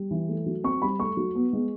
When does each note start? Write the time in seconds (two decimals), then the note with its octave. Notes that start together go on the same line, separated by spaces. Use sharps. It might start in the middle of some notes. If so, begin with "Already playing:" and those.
Already playing: G3
0.11 E3
0.29 A3
0.46 F#3
0.64 C4 C#6
0.82 G3 B5
1.00 A3 C#6
1.17 F#3
1.35 B3
1.53 G#3